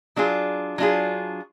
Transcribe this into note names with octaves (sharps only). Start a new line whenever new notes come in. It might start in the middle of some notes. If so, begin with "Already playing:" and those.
F#3 D4 F4 G#4
F#3 D4 F4 G#4